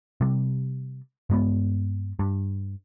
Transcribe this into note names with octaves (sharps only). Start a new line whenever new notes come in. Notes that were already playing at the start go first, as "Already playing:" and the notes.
C3 G3
G2 G#3 A#3 B3
G2